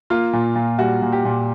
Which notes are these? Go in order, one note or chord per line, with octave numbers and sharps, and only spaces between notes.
A#3 F4
A#2
A#2
G3 F#4
A#2
G4
A#2